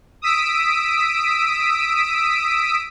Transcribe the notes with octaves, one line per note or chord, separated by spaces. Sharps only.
D#6 E6 B6 D7